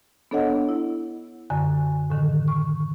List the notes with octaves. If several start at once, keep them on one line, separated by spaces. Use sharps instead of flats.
B3 D4 A4 C#5 D#5 F#5
E4
F#2 D3 G#5
A2 D3 D#3
C#6